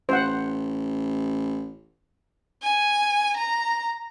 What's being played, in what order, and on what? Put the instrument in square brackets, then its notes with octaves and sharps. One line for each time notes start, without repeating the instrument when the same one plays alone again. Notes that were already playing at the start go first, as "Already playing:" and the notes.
[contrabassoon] A1 [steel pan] C5 F#5
[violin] G#5
A#5